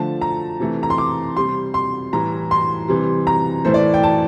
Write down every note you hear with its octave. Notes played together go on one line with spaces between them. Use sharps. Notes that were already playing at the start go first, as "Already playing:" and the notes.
Already playing: D3 F3 A3 A5
A#5
C3 E3 A3
A#5
C6
D6
C3 G3 C6
C6
A2 E3 G3 A#5
C6
C3 E3 G3
A#5
A2 E3 A3 C5
D5
G5
A5